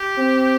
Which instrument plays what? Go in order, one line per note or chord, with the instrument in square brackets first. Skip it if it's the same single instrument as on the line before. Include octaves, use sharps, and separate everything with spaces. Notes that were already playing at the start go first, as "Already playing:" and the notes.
Already playing: [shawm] G4
[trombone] C4